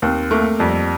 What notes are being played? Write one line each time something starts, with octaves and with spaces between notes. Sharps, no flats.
D#2 C4
A3 A#3
F2 G3